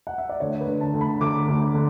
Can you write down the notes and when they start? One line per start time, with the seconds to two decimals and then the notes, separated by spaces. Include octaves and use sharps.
0.07 F#5
0.18 E5
0.29 D5
0.40 D2 C#5
0.61 B4
0.67 D3
0.81 A5
0.94 D2
1.01 B5
1.21 D2 D6
1.48 D2
1.74 D3